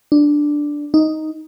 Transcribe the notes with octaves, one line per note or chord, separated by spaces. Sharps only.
D4
D#4